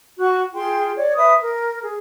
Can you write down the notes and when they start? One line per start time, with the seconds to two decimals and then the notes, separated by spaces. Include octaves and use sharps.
0.18 F#4 C#6 F#6
0.54 F4 G#4 G5 C6
0.96 C#5 D5
1.15 B4 E5 D#6
1.41 A#4
1.81 G#4